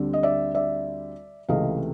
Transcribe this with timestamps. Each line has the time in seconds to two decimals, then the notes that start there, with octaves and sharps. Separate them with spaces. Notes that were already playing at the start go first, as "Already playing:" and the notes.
Already playing: D2 D3 G3 C4
0.13 D#5
0.23 D5 E5
0.55 D5 E5
1.49 C#2 C3 E3 A3 C4 D#5 F5